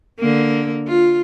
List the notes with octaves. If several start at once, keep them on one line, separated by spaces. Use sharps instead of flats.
D3 A#3
F4